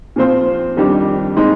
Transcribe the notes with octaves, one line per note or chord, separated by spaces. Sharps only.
A#2 F3 C4 F4 C5
F2 D#3 G3 D4 G4
G#3 C4 D#4